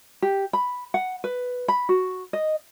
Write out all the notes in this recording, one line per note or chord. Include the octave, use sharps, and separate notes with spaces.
G4
B5
F#5
B4
B5
F#4
D#5